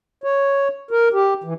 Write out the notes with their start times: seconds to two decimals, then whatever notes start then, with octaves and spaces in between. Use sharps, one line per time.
0.24 C#5
0.91 A#4
1.13 G4
1.44 E3